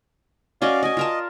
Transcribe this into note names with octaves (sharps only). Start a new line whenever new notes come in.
C#4 F#4 D5 D#5 F5
D5 D#5 G#5
F4 A#4 A5